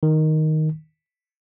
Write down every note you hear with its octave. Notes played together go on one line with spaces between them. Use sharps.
D#3